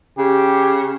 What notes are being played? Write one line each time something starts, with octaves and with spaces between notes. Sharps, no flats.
C#3 G4